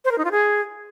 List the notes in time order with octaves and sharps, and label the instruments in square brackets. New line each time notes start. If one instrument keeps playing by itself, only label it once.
[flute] C5
A#4
D#4
F4
G#4